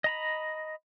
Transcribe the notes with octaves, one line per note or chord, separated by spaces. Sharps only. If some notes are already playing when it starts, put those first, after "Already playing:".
D#5 A#5 B5